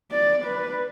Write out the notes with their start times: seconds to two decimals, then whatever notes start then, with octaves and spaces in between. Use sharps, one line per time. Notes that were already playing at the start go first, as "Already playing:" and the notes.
0.11 D5
0.45 B4